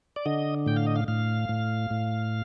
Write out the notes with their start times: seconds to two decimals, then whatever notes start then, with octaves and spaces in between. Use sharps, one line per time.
0.16 D5
0.26 D3 D#5
0.66 A2 G5
0.76 F5
0.86 D#5
0.96 F5
1.08 A2 F5
1.49 A2
1.91 A2